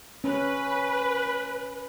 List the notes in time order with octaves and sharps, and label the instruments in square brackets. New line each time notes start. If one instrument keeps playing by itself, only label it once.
[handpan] C#4 [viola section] B4